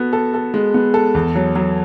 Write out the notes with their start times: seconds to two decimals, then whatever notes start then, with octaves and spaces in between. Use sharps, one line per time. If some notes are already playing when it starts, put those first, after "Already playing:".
Already playing: B3 F#4 A4
0.13 A4
0.34 A4
0.54 G#3
0.74 B3
0.94 A4
1.15 E2
1.35 F#3
1.55 F#3